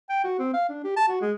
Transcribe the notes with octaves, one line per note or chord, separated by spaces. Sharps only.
G5
F#4
C4
F5
D4
G4
A5
F#4
G#3